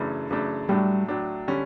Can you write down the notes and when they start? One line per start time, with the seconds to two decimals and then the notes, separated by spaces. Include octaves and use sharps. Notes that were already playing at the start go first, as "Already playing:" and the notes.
Already playing: F#2 C#3 E3 A3 D4
0.31 F#2 C#3 E3 A3 D4
0.69 A2 F#3 G3 A3 D4
1.08 A2 F#3 A3 D4
1.48 D3 G3 C#4